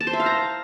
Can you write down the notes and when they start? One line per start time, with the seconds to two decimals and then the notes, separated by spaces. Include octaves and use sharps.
0.01 A5
0.07 C5
0.13 E5
0.20 F5
0.26 A#5